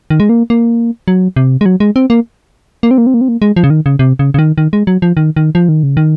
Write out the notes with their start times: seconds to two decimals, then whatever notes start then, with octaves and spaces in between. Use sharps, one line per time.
0.10 D#3
0.20 G#3
0.29 A#3
0.50 A#3
1.08 F#3
1.36 C3
1.61 G#3
1.66 F#3
1.80 G#3
1.96 C4
2.10 A#3
2.83 A#3
2.91 C4
2.98 A#3
3.07 C4
3.14 A#3
3.21 C4
3.28 A#3
3.42 G#3
3.56 F3
3.64 C#3
3.70 D#3
3.86 C#3
3.99 C3
4.19 C#3
4.34 C#3
4.39 D#3
4.58 D#3
4.73 G#3
4.87 F#3
5.02 F3
5.17 D#3
5.36 D#3
5.55 F3
5.69 D#3
5.83 C#3
5.97 D#3